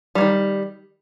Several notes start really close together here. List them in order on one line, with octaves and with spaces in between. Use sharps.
G3 F#3 D#3